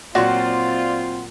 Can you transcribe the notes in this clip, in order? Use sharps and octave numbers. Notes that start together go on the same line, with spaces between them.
A#2 F#3 C4 F4 F#4 D5 C6